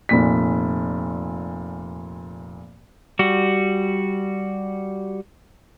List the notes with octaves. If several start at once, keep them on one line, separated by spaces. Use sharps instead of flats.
F1 A#2 B6
G3 F#4